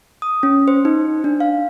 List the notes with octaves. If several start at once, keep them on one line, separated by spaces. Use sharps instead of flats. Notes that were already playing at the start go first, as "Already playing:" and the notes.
D#6
C#4
C5
D#4
D4
F5